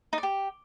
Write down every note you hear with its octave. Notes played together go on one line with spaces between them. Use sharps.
D#4
D5
G4